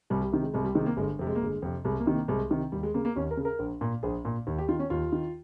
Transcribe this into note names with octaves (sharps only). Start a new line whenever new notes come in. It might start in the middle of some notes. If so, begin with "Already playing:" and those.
C2 G3
G3
C3 D#3
G#3
C2 G#3
G3
C3 D#3 G#3
A#3
G1 G#3
F2 C3
G#3
A#3
G1 G#3
F2 C3
C2 G#3
A#3
C3 D#3
A#3
C2 G#3
C3 D#3
D#2 G3
G#3
C#3 A#3
A#3
D#2 C#4
A#4
C#3
A#4
A#1
A#2
A#1 G#4
A#2
D#2
G4
D#3 F4
C#4
D#2 F4
D#3